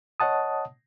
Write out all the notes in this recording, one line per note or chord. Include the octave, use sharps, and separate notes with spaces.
C#5 D#5 F#5 A5 D#6